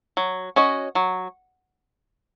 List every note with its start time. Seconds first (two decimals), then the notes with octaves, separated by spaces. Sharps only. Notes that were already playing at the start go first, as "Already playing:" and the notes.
0.17 F#3
0.56 C#4 F#4 D#5
0.95 F#3